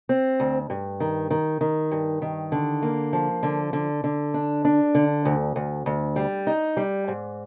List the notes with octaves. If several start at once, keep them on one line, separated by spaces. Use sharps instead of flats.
C4
D2
G2
D#3
D#3
D#3
G2
D#3
D3
A#3
F3
D3
D3
D3
D4
D4
D3
D2
D2
D2
G3
D#4
G3
G#2